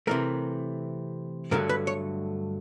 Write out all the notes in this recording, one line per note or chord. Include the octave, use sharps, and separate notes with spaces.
C3 E3 A3 A#4
G2 D3 F#3 A3 A#4
B4
C#5